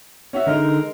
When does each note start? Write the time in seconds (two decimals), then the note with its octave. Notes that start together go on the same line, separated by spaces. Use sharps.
0.33 C#4 F#4 E5
0.47 D3 G#3 D#4 A#4